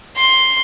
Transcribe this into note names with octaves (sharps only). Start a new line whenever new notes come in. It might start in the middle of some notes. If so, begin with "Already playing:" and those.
C6